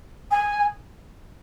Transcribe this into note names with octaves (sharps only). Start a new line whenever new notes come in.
G#5